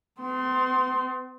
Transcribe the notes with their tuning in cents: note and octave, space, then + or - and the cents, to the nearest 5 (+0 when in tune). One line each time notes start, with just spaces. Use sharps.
C4 -45 C6 +0